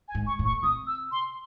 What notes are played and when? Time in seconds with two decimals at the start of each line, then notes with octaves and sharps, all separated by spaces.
0.08 G#5
0.15 G#2
0.27 C#6
0.39 A2
0.45 C#6
0.63 C3 D#6
0.87 E6
1.12 C6